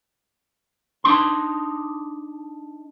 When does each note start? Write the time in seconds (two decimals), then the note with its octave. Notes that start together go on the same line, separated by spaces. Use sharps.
1.04 D4 D#4 C6